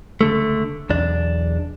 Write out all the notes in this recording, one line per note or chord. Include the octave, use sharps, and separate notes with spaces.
C#2 D3 A3
B1 E2 D4